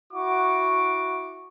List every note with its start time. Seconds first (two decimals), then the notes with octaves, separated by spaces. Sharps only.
0.13 E4 F#4 F#5 C#6 D6